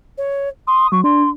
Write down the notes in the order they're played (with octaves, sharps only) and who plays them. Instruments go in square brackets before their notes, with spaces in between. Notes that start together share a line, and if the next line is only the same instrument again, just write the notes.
[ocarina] C#5
[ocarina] C6 [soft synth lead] D#6
[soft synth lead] F#3 [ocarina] C#6
[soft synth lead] D4 [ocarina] C6